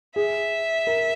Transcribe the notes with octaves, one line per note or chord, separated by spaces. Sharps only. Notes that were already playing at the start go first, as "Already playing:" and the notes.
G#4 E5
A#4